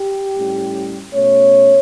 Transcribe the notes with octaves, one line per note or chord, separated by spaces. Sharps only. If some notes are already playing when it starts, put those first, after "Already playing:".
Already playing: G4
A2 G3 C#4
B2 A3 C#4 C#5